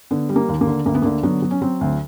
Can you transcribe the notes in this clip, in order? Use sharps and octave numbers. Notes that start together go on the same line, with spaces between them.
D3 B3
G3
A#3
D#2
A#3
D3
D2 A#3
B3
D3 A#3
F#3 B3
F#3
C#4
F#3 C4
D2